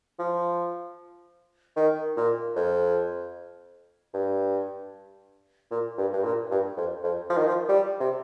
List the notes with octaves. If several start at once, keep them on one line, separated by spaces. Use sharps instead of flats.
F3
D#3
A#2
F2
G2
A#2
G2
G2
A#2
G2
F2
F2
F3
D#3
F3
G3
C3